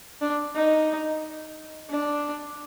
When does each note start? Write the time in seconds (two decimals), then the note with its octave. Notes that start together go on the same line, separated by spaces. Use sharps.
0.21 D4
0.55 D#4
1.90 D4